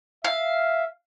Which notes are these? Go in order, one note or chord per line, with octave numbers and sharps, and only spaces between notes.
E5 F5